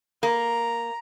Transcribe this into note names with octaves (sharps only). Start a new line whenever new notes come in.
A#3 A#5